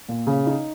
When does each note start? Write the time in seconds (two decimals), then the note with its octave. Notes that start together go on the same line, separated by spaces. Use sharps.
0.09 A#2
0.27 C#3
0.47 D#4